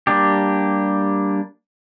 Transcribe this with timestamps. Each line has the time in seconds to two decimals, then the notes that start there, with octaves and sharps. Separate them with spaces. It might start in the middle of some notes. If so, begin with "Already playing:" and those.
0.07 G3 A#3 D4 G4